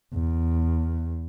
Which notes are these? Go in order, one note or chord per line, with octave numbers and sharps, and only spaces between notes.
E2